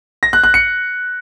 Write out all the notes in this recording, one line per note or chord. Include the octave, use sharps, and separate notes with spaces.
A#6
F#6
F#6
C#7